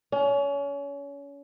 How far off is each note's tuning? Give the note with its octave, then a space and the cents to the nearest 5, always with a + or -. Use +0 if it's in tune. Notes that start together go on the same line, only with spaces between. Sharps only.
C#4 +30